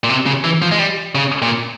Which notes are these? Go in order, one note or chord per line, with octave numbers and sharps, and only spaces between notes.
A#2
C3
C#3
E3
F3
G#3
G3
C#3
A#2